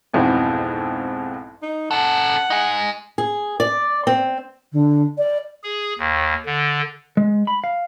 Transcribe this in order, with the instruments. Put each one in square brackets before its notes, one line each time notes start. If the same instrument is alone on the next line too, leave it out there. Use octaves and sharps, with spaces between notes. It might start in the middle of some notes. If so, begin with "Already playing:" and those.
[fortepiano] B1 F2 G#2 E3 C4 F#4
[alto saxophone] D#4
[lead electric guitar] C#4 A4 [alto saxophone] F#5
[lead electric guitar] D#4 G#4
[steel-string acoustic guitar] G#4
D5
C4
[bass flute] D3
D5
[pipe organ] G#4
D#2
D3
[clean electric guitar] G#3
B5
F5